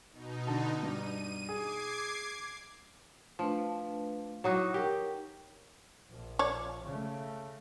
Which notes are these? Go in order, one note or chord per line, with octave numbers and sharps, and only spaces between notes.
B2 D#4
D3 A5
G2 D#7
G#4 D6 G#6 C7
F3 A3 D4 B4
F#3 D#4 E4 F#4 C#6 D6
D#4 G4 A#4 G5
A#1 F3
C#5 D5
C#3 A3